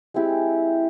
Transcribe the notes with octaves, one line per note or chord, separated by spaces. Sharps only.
G#3 C4 E4 G4